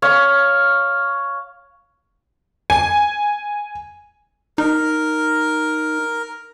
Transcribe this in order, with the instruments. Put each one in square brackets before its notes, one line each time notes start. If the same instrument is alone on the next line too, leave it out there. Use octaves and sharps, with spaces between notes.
[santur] C#5 F5
[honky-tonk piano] G#5
[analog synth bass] D#4 [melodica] A#4